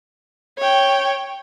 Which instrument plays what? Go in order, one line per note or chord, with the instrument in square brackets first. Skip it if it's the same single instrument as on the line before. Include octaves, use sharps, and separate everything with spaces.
[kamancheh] C#5 G5